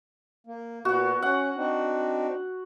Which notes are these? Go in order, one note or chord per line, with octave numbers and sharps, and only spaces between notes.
A#3
A#2 B3 F#4
C#4 F#5
C4 D4 D#4